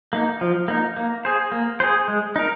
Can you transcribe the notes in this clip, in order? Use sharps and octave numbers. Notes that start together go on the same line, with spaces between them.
A#3 D#4
F3
A#3 D#4
A#3
G#4 C5
A#3
G#4 C5
G#3
D#4 A#4